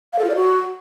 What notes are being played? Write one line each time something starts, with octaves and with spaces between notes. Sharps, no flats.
F5
A4
F4
D5
F#4